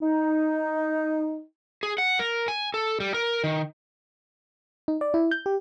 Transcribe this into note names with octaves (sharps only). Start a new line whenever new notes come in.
D#4
G#4
F#5
A#4
G#5
A4
G3
A#4
D#3
D#4
D5
E4
G6
G4